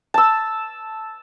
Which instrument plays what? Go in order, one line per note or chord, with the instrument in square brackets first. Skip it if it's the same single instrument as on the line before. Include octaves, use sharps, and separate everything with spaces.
[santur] A5 E6